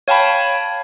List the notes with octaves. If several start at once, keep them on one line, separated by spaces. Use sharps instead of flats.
C#5 F5 G5 A5 B5